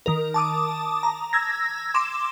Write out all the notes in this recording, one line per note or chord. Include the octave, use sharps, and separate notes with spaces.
D#3 A#4
A5 D6 D#6
A#5
E6 G#6 A#6
C6 D6 E7